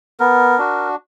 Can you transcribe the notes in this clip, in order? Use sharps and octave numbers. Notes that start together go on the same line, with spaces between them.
B3 A#4
D4 F#4